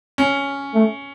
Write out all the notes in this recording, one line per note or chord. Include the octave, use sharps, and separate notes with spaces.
C#4
A3